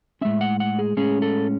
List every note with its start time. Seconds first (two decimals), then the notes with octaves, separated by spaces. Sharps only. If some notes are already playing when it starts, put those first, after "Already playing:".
0.21 A2 G#3 C#4 E5
0.41 F#5
0.60 F#5
0.79 G#4
0.97 A2 G#3 C#4 G#4
1.22 A4